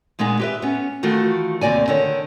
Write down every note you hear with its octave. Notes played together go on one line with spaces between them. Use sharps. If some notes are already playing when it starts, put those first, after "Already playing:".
A#2 G#3 B3 D#4 G#4
G4 B4 E5
B3 C#4
D#3 E3 A3 F4 F#4
D#2 C3 A#3 D5 G#5
D3 D#3 C#5